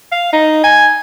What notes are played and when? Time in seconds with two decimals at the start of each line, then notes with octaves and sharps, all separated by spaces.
0.12 F5
0.33 D#4
0.64 G#5